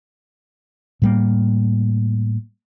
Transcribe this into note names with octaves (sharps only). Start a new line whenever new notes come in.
A2 G3 A#3